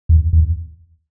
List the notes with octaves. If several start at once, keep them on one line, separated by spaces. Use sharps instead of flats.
E2
E2